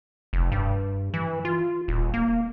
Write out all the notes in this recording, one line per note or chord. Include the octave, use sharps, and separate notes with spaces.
F1
G2
E3
F4
D#1
A#3